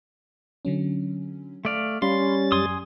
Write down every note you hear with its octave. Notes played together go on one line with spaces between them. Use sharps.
D3 F#3 C#4
A3 D5 F5
G3 C#4 F5 B5 C6 A6
F#2 G#5 C6 D#6